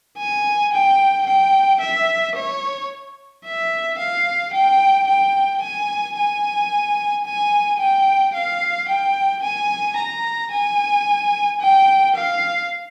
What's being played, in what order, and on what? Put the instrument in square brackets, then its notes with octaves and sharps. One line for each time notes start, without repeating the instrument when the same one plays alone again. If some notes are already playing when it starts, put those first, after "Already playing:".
[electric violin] G#5
G5
G5
E5
C#5
E5
F5
G5
G5
G#5
G#5
G#5
G5
F5
G5
G#5
A#5
G#5
G5
F5